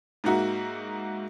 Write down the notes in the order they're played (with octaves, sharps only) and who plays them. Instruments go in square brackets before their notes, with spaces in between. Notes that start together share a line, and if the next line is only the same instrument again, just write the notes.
[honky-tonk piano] G#2 A#3 D#4 F#4 E5 F#5